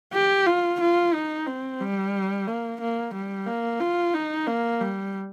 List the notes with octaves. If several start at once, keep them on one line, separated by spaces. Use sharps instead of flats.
G4
F4
F4
D#4
C4
G3
A#3
A#3
G3
A#3
F4
D#4
A#3
G3